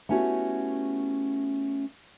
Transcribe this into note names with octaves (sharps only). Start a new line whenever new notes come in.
A3 B3 C#4 E4 F#4 G4